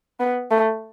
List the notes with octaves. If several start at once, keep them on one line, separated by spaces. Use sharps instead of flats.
B3
A3